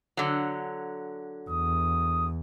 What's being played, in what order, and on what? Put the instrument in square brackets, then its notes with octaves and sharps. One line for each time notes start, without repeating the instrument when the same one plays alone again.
[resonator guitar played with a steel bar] D3 F#3
[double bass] E2 [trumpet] D#6